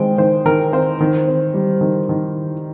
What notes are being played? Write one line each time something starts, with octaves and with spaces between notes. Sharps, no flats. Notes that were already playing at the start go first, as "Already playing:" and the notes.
Already playing: D#3 G#3 C4 C5 G5
D#3 C5
D#3 A#4
C4 C5
D#3
C4
G3
D#3
D#3